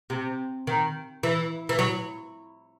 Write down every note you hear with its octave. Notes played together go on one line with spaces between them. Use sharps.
C3
D#3
E3
E3
F#3